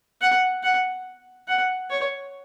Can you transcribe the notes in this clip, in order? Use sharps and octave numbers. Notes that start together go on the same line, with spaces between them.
F#5
F#5
F#5
C#5